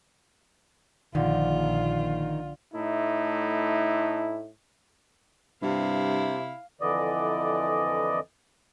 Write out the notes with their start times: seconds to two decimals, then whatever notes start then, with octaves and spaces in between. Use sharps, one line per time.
1.15 A#1 D3 D#3 F4
2.73 A2 A3 D#4 E4
5.62 G2 C3 E4 F5
6.81 F2 D3 E3 D5 D#5